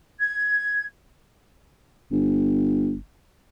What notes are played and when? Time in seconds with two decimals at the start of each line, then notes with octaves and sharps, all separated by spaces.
0.19 G#6
2.12 G1